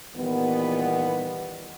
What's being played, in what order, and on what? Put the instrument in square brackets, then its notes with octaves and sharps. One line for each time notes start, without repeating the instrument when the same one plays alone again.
[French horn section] A#2 D#3 E3 G3 B3